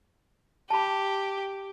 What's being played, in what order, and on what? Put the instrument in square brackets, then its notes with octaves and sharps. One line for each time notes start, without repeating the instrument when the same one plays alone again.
[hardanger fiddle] G4 [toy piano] A5 B5